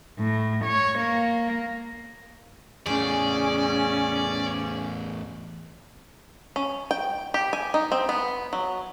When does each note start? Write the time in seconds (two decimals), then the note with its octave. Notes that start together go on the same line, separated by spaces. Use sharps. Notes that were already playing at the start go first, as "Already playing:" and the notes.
0.18 A2
0.65 C#5
0.99 A#3
2.86 E2 A2 C#4 G#4 D5
6.56 C#4
6.91 G5
7.34 G4
7.53 G#5
7.74 D#4
7.92 C4
8.09 B3
8.53 F#3